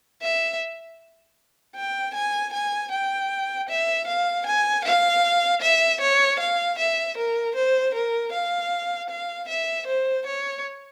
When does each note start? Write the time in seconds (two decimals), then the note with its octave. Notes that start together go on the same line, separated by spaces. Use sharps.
0.22 E5
1.76 G5
2.14 G#5
2.53 G#5
2.91 G5
3.69 E5
4.07 F5
4.46 G#5
4.85 F5
5.62 E5
6.01 C#5
6.40 F5
6.78 E5
7.17 A#4
7.55 C5
7.94 A#4
8.32 F5
9.09 F5
9.48 E5
9.87 C5
10.26 C#5